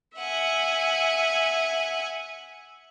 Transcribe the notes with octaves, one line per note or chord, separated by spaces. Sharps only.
E5 F#5 G#5